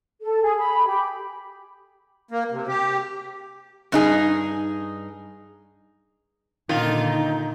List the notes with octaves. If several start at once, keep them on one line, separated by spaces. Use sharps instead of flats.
A4
G#4
B5
G4
A#3
C3
G4
G2 D#4 G#4
A#2 D3 D#3 D#4 F4